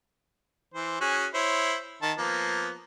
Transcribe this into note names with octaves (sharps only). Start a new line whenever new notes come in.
E3 C5
C#4 F#4 G#4
E4 C5 C#5
D#3 A5
F3 A#3 B3